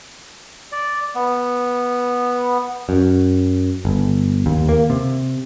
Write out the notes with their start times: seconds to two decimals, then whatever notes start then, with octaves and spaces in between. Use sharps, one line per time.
0.72 D5
1.15 B3
2.89 F#2
3.85 G1
4.46 D#2
4.69 A#3
4.90 C3